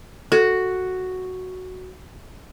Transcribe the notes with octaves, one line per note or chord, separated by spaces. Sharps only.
F#4 A4